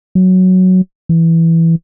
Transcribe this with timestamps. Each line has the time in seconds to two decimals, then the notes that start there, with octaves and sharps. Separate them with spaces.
0.15 F#3
1.09 E3